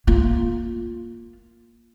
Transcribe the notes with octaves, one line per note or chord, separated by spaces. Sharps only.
A#3 F4